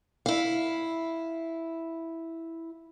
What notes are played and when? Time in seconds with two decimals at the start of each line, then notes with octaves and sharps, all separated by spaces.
0.26 E4 F5